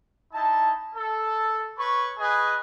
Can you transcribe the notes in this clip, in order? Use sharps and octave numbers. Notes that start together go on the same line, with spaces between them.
D#4 E4 A5
A4
B4 C#5 C#6
G#4 B4 D#5 G#5